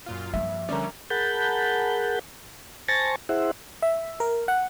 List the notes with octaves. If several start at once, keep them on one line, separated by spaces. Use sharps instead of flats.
F#2 A#2 F4
G2 F3 A#3 E5
D3 G3 C#4 A#4 D5
G#4 A#4 F#5 A5 B5 G6
C5 G#5 A5 C#6 A6 A#6
E4 G#4 C5 E5 F#5
E5
A#4
F#5